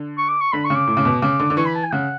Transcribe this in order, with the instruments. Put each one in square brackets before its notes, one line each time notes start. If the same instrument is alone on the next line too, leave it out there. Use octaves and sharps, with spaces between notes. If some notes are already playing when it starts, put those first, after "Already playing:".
Already playing: [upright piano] D3
[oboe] C#6
D6
C#6
[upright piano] D3 [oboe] B5
[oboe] C#6
[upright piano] C#3
[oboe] D6
[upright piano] A2
C#3
B2
[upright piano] C#3 [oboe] D6
[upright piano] D3
D3
[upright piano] E3 [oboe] C#6
[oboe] B5
A5
G#5
[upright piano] C#3 [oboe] F#5